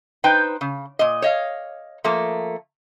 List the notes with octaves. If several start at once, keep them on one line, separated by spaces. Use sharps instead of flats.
D#4 B4 C5 G5
C#3
A#2 D#5
C#5 D#5 F5
F3 A3 A#3